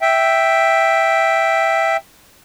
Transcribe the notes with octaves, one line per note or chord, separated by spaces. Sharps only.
E5 G5